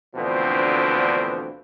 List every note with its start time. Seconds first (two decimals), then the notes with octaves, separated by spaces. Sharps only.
0.16 D2 B2 D3 E3 F3 C4